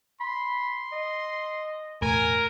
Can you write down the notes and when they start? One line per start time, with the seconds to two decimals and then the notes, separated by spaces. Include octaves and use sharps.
0.21 B5 C6
0.92 D#5
2.02 E1 A2 A#4 G#5